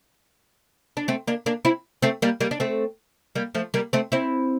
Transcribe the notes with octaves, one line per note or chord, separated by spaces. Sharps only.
D4
A3 C4
A#3 D4
A#3 D4
C4 E4
A3 C4
G3 A#3
G3 A#3
D4
A3 C4
G3 A#3
F3 A3
G3 A#3
A3 C4
C4 E4